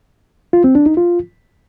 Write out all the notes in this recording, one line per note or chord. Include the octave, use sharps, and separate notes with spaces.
F4
C4
D4
D#4
F4